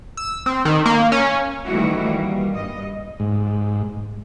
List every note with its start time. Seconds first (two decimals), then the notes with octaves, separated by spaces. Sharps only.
0.17 E6
0.46 C4
0.65 D#3
0.86 A#3
1.12 C#4
1.66 D#3 E3 G3 A3 E4 F#4
2.08 G3 A#3
2.53 G2 D#5
3.20 G#2